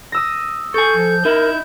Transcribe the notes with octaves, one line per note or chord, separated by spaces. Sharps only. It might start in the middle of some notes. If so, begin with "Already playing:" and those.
D#6 E6 A#6
A4 G#5 C#6 G6
F3
D#4 E4 A#4 E5